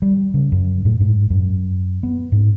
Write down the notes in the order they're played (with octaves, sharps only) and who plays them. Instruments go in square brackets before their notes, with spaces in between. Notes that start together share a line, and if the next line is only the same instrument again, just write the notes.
[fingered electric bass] G3
C#3
F#2
A2
G#2
F#2
B3
G#2